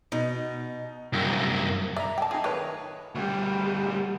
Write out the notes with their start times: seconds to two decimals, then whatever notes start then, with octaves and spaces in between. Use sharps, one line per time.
0.12 B2 D#4
1.13 C2 F#2
1.97 D5 E5 A#5
2.18 G5 A5
2.31 D#4 F4 G#4
2.44 D#3 A3 B4 C#5
3.15 D2 G3